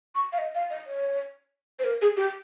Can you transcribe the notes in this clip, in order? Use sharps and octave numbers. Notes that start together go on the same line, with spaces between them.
C#6
F5
D#5
F5
D#5
C#5
C5
A#4
G#4
G4